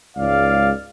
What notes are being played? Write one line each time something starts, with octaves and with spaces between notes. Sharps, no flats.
C#2 G#2 D5 F5